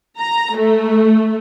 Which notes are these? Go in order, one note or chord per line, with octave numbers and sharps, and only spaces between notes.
A#5
A3